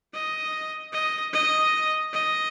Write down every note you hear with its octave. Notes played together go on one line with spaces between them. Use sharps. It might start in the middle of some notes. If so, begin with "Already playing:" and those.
D#5
D#5
D#5
D#5